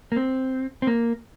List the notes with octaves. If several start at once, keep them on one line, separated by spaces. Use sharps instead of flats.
A#3
C4
C4
A#3